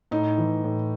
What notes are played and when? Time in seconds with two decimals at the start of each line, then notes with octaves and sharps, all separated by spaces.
0.11 A2 D#4
0.38 E3
0.64 A2